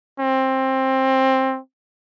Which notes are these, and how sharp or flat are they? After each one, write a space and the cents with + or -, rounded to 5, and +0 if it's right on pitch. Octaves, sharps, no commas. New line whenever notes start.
C4 +15